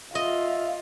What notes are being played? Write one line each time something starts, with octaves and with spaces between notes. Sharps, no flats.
F4 D#5 E5